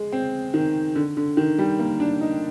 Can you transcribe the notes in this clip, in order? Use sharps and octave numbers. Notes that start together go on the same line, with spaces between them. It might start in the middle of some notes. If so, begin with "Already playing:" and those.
Already playing: G#3
C4
D#3
D3
D3
D#3
G3
A#3
D4
D#4